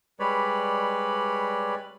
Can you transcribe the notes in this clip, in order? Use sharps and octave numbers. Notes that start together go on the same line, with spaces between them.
G3 G#3 B4 C#5 D5 B5